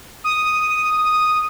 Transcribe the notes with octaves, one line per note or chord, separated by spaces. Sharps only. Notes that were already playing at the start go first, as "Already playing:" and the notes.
D#6